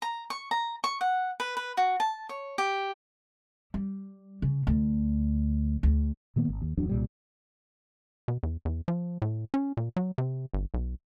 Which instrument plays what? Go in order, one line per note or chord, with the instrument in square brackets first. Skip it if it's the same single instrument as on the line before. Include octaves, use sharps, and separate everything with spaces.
[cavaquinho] A#5
C#6
A#5
C#6
F#5
B4
B4
F#4
A5
C#5
G4
[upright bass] G3
C#3
D2
D2
[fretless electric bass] A#2 D#3 A#3 B3
G#1
D#2
D1 E2 F#3 D4
C2 A#2 G3
[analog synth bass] B2
E2
E2
F3
A2
C#4
A#2
F#3
C3
G1
B1